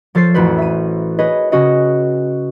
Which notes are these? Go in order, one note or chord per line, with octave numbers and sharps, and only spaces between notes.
F3 A4 C5 C#5 A6 C7
A1 F2 F#4 B4 C5
E5 D#7
G#4 B4 C#5 D#5
C#3 C#4 F#4 D#5 C#7